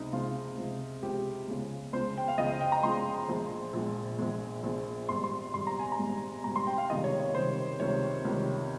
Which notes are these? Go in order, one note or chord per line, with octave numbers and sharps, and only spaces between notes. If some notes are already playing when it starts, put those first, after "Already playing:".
Already playing: C#2 C3 F3 G#3 D#4
C#2 C3 F3 G#3 F4
C#2 C3 F3 G#3
C#2 C3 F3 G#3 G4
C#2 C#3 F3 G#3
C#2 C#3 F3 G#3 C5
G5
F5
C#2 C#3 F3 G#3 D#5
F5
G5
A#5
C#2 C#3 F3 G#3 C6
A#1 A#2 F3 G#3
A#1 A#2 F3 G#3
A#1 A#2 F3 G#3
A#1 A#2 F3 G#3
G#1 G#2 G3 C6
C6
G#1 G#2 G3 C6
A#5
G#5
A#5
G#1 G#2 G3
G#1 G#2 G3 A#5
C6
G5
F5
C#2 C3 D#3 G3 D#5
C#5
C#5
C#2 C3 D#3 G3 C5
C#2 C3 D#3 G3 C#5
C#2 C3 D#3 G3